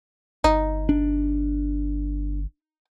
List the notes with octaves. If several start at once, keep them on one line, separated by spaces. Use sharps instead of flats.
G1 D#4
D4